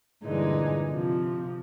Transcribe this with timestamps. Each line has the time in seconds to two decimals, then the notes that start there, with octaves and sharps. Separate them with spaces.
0.23 G2 A#2 D3 E3 G#3 D#4
0.92 C3 F3